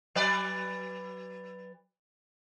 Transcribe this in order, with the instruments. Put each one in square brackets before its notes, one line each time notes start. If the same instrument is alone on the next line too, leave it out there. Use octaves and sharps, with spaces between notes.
[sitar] F#3 B4 D5